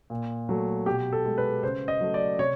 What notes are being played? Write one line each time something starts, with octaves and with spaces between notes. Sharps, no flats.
A#2
F#3 A3
B2 G4
A4
G#3
B4
C#3 C5
D#5
F#3 A3
D5
C3 C#5